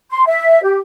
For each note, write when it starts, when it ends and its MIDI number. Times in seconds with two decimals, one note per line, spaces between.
0.10 0.24 84
0.26 0.62 76
0.62 0.78 67